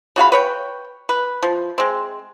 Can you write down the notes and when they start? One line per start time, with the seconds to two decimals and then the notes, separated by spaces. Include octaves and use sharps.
0.16 C#3 F#4 F5 B5
0.32 B4 C#5 G5
1.09 B4
1.43 F3
1.78 G#3 C4